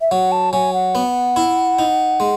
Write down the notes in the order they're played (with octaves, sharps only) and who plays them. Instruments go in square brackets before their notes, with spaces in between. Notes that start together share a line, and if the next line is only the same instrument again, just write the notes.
[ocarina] E5
[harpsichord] F#3 [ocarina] F#5
[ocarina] A5
[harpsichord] F#3 [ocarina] G#5
[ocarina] F#5
[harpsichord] B3
E4
D#4
G#3